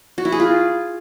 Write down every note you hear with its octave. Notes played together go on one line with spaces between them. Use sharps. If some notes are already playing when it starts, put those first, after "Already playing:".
F#4
E4
G#4
F4